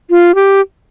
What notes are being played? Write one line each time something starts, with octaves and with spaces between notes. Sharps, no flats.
F4
G4